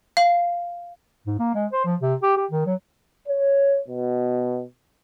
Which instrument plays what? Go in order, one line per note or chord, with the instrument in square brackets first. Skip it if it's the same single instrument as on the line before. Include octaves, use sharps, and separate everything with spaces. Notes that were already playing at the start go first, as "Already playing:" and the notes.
[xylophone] F5
[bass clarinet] G#2
A#3
G#3
C5
F3
C3
G4
G4
D#3
F#3
[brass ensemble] C#5
B2